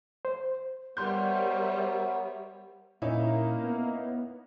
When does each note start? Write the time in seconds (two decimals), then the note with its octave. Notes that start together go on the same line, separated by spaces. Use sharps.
0.25 C5
0.97 G3 B3 A#4 C5 C#5 E5 C6 G6
3.02 A#2 A#3 C#4 D#4 E4
3.64 B3